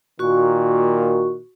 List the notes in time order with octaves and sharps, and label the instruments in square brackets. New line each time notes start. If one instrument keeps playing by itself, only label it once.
[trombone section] A#2 D#3 A#3 [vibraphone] F#4 C#6